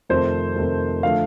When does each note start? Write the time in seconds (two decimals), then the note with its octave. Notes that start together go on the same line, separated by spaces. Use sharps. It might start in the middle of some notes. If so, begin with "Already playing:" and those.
0.09 F2 C3 D#3 A3 C5
0.56 F2 C3 D#3 A3
1.03 D3 F3 A3 F5